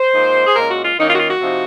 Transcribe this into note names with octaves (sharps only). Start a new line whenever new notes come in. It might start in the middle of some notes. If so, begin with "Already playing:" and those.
Already playing: C5
A#2 G#3 D#4
G#4
A#2 G#3 C#4 A#4
F#4
F4
D#3 A#3 C#4 D#4
F4
F#4
F4
F#4
C3 F3 C4 D#4